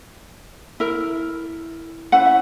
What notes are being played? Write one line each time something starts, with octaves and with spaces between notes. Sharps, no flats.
E4 A#4
C#4 E4 B4 F#5
E5